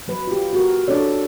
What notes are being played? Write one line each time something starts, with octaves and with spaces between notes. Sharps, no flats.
F#3 B4
F4 G4
F#4 A#4
D4 A4 C#5 D5